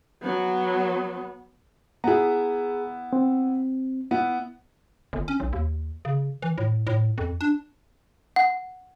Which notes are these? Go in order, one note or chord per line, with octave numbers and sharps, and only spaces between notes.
F#3 B3
B3 E4 G#4 A#5
C4
B3 E4
G1
C#4
B1
D#2
C#3
E3
A2
A2
F2
D4
F#5